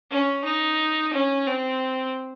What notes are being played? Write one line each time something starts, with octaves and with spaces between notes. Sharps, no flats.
C#4
D#4
C#4
C4